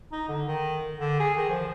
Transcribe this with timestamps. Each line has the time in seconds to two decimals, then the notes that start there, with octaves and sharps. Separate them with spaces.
0.12 D#4
0.29 D3
0.48 D#3
0.98 D3
1.20 G#4
1.37 D#3
1.50 F3